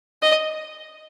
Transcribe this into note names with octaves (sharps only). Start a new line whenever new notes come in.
D#5